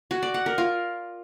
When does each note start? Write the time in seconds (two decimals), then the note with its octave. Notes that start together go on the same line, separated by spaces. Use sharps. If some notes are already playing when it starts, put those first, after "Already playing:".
0.11 F#4
0.23 D5
0.34 F#5
0.46 A#4
0.58 F4